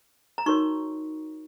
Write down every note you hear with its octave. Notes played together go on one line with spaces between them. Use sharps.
A#5
D#4 F#4 A#4 C#5 C#6